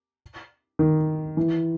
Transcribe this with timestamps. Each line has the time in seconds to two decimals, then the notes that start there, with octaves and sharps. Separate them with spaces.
0.79 D#3
1.37 E3